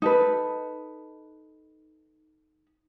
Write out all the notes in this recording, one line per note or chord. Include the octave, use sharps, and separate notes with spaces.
D#4 A4 B4